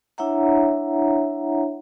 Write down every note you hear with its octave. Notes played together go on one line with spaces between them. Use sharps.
D4 E4 C#5 E5 F#5 A#5